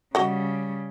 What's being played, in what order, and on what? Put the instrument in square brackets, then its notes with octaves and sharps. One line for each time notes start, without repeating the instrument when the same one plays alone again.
[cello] C#3 G3 [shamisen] F#4 D#5 F#5